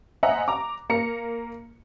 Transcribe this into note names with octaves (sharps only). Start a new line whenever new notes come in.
C5 D#5 E5 F#5 G#5 A#5
A#5 D6
A#3 A#5 C#7